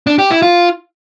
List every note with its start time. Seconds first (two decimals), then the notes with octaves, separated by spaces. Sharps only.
0.07 D4
0.19 G4
0.30 E4
0.42 F4